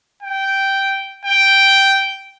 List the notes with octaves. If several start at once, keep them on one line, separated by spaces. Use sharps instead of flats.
G5
G5